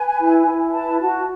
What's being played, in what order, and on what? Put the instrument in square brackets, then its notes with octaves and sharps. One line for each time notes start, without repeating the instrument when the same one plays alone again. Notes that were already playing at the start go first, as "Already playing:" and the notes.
Already playing: [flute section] B4 G#5
E4
E4
B4 A5
F#4 A5